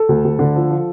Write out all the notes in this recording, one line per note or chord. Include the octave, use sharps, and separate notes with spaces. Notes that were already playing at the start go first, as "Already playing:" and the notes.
Already playing: A4
D2
D2
D3
F3
F3